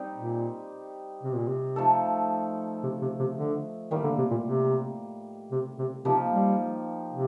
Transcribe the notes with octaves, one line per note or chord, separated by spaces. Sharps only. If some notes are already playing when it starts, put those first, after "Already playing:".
Already playing: G3 C4 D#4 G4
A#2
C3
A#2
C3
F3 A3 D#4 A4
C3
C3
C3
D3
A2 D#3 G3 A#3
D3
C3
A#2
C3
C3
C3
C3 F3 A#3 D#4 G4
G3
C3